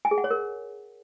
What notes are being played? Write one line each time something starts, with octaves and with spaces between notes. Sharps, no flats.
G#5
G#4
F#5
C#5
A#4